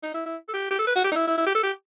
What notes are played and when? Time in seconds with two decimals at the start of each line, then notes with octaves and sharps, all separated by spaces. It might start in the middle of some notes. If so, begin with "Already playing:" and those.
0.03 D#4
0.14 E4
0.26 E4
0.49 A4
0.54 G4
0.71 G4
0.79 A4
0.87 B4
0.96 F#4
1.04 G4
1.12 D#4
1.16 E4
1.27 E4
1.38 E4
1.47 G4
1.55 A4
1.64 G4